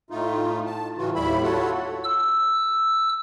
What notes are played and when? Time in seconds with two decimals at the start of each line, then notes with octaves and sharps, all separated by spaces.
0.10 A2 A3 D#4 F4
0.66 A5
0.98 A2 C#3 E3 F4 F#4
1.15 D#2 A2 G3 E4 E5 B5
1.42 F4 F#4 A4 C#5 F#5 A5
2.04 E6